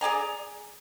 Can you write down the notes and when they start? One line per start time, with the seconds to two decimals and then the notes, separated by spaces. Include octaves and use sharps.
0.01 G#4 D5 G#5 A#5